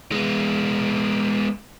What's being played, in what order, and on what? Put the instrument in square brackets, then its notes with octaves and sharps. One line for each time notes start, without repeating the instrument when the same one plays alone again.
[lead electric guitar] G#3 B3